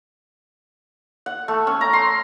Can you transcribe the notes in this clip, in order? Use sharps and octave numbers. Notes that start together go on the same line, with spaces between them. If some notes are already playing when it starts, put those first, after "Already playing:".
F#5
A3
C#4
A#5
C6